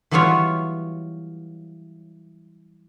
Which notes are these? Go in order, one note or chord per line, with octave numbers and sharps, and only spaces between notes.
E3 F#3 G3 B3 F4 C#5